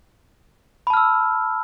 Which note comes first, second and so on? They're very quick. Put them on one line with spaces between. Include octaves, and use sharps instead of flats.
B5 A5 F6 E6